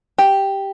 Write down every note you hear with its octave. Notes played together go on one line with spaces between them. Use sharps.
G4